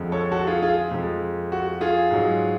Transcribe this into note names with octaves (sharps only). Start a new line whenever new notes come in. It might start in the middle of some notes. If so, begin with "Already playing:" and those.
Already playing: F2 D3 F3 G#3
A4 C#5
F#4 A4
F4 G#4
F4 G#4
F2 F3 G#3
F#4
F4 G#4
G#2 F#3